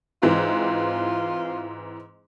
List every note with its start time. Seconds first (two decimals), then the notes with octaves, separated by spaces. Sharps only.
0.23 G#2 E3 C4 F4